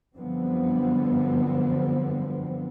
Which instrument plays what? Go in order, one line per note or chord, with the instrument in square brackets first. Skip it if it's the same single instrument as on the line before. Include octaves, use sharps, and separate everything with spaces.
[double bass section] F#2 D3 F3 G3 B3 C4